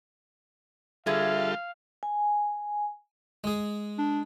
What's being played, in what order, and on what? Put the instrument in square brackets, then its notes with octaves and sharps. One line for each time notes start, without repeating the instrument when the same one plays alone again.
[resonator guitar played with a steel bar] D3 G#4 B4 [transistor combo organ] G3 F4 A4 [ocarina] E5 [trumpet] F5
[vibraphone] G#5
[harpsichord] G#3 G#4
[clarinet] D4